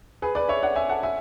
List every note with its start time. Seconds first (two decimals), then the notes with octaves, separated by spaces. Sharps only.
0.22 G#4 B4
0.35 B4 D5
0.48 C#5 E5
0.63 D5 F#5
0.76 E5 G#5
0.89 F#5 A5
1.03 E5 G#5